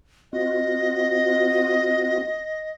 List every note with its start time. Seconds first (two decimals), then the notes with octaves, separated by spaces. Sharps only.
0.33 C4 F4 F#4 D#5